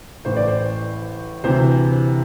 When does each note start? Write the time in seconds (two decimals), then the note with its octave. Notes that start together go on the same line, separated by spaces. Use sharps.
0.25 A1 A2 E3 C5
0.37 D5
0.48 C5
1.43 D2 C3 E3 C5